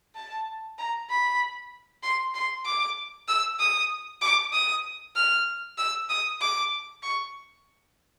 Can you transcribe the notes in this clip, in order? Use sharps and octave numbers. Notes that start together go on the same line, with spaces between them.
A5
A#5
B5
C6
C6
D6
E6
D#6
D6
D#6
F6
E6
D#6
D6
C#6